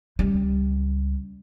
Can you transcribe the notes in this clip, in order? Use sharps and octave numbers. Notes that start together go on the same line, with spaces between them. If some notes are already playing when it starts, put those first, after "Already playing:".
C#2 G3